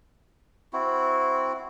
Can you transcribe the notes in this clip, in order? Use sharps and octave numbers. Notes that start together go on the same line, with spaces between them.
C4 E4 F#4